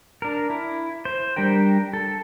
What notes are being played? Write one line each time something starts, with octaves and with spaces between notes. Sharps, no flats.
D4 A#4
E4
C5
G3 D4 A#4 G5
A4